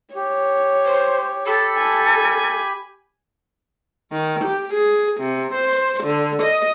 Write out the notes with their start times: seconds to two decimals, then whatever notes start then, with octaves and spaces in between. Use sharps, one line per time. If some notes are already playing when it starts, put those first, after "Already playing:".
0.15 G4 C#5
0.86 C5
1.46 G4 A4 B5
1.78 G#5
4.11 D#3
4.44 G4
4.74 G#4
5.19 C3
5.52 C5
6.02 D3
6.41 D#5